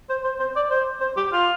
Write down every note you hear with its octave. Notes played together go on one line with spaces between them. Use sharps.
C5
C5
C5
D5
C5
C5
G4
F4